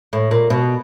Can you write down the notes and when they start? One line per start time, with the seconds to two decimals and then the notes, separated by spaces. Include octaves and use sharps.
0.13 A2
0.31 A#2
0.50 B2